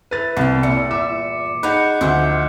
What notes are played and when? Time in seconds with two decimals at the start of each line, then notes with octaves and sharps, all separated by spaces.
0.11 E4 B4 A6
0.37 C2 B3 G5
0.63 E2 G2 A#2 C#7
0.91 E5 D6
1.63 D#4 G#4 F5 F#5 B5 F#6 G6 C#7
2.01 D2 F3 D#4 E4